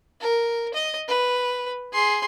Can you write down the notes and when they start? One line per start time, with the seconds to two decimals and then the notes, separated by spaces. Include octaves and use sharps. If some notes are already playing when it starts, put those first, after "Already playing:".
0.21 A#4
0.74 D#5
1.08 B4
1.93 G#4 C6